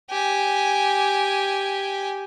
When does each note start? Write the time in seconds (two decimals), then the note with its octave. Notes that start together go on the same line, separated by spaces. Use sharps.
0.10 G4 G#5